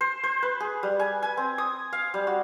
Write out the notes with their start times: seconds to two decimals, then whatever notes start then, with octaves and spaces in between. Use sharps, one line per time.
0.01 C5
0.23 C5
0.43 B4
0.60 G#4
0.83 G3
0.99 G#5
1.22 G#5
1.37 C4
1.58 D#6
1.93 F5
2.14 G3
2.27 F#4